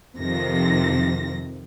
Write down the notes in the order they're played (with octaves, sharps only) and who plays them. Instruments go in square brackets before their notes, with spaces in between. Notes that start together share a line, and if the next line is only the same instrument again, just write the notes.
[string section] F2 C3 D#3 F3 A#6